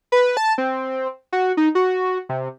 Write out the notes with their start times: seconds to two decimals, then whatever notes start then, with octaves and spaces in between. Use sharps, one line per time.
0.12 B4
0.37 A5
0.58 C4
1.33 F#4
1.57 D#4
1.75 F#4
2.29 C3